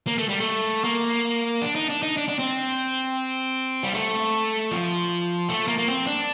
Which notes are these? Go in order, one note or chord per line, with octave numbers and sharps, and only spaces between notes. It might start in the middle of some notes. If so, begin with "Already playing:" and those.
A#3
A3
G3
A3
A#3
D4
D#4
D4
D#4
D4
D4
C4
G3
A3
F3
A3
A#3
A#3
C4
D4